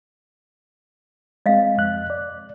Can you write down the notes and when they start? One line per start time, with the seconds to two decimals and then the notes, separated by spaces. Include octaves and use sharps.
1.46 G#3 C4 D#5 F5
1.78 F2 F#6
2.10 D5